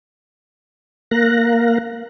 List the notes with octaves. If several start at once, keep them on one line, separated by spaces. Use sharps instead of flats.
A#3 A#4 F5 F#6 A#6